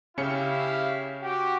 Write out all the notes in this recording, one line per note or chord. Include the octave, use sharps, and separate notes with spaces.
C#3 C#4 E4 G4 F5 C#7
F#4 G4